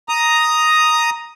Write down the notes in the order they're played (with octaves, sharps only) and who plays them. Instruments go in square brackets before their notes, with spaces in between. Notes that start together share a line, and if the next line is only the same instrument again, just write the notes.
[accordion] A#5 D#6